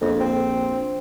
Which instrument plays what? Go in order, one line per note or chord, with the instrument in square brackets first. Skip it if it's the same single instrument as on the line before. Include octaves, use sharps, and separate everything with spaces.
[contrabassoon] A#1 [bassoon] F2
[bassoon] C4